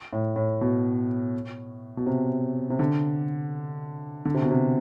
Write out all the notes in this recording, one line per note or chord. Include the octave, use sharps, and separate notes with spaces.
A2
A2
B2
B2
C3
C3
D3
D3
C3
B2
C3